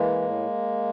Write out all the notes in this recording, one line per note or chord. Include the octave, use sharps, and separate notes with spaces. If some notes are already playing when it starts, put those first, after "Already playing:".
Already playing: E3 G#3 A#3
A2